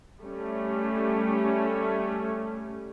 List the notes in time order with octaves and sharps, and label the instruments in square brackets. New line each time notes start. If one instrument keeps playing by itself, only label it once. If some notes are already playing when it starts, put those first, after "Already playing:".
[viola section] G3 A3 C#4